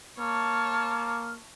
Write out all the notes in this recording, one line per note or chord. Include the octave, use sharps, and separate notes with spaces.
A#3 C#5 A5 F6